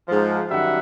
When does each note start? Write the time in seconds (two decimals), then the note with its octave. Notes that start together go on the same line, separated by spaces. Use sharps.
0.08 G#2 F3
0.50 F#2 D#3 G3 E5 F#5